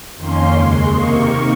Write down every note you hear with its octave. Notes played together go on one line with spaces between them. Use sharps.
F2 D#3 A#3 C#4 C6
D#2 C#3 G#3
C3 D#3 A#3 C#6